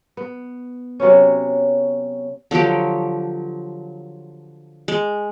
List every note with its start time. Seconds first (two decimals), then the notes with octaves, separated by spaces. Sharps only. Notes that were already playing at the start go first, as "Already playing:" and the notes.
0.17 B3
1.00 C3 F#3 B3 C#4
2.51 D3 F3 F#3 G4
4.88 G#3